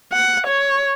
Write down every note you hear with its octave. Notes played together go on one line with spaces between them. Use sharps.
F#5
C#5